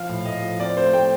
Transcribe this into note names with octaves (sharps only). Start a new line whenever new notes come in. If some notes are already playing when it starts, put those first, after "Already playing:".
Already playing: F3 F5
A2
A2 D#5
F3
C4 D5
A3 C5
A3 G5